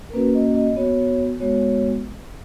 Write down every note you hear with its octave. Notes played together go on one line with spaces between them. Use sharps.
A#4
A#3 C#4 F#4 B4
D#5
D#5
B3 F#4 C#5
G#3 B3 F#4 C#5